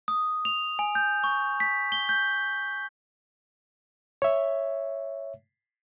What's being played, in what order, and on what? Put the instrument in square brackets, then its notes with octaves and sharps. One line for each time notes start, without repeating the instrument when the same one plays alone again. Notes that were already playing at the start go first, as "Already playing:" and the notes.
[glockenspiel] D#6
F7
G#5
G6
C#6
B6
G7
G6
[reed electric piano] C#5 E5